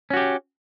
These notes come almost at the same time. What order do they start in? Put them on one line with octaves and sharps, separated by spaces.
C#4 F#4 G4